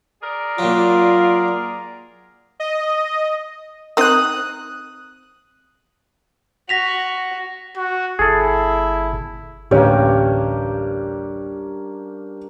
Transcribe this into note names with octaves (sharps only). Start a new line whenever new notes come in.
G#4 A#4 D5
A#2 F#3 F4
D#5
C4 D#4 A#4 D#6 F#6
F#4 A#6 B6 F7
F#4
G1 E4 G#4 A4
D1 A1 G2 D3 A#3 C#4 G4